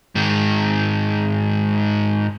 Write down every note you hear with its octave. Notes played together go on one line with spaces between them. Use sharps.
G#2 D#3